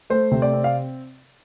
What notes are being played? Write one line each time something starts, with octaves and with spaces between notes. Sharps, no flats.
A3 C5
C3
D5
C4
F5